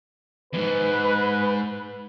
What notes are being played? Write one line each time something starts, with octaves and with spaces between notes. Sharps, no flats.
E2 G#2 B4